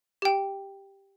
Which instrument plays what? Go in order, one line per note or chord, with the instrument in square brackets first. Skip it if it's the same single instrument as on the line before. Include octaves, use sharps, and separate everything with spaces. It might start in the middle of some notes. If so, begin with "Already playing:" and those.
[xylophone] G4 G5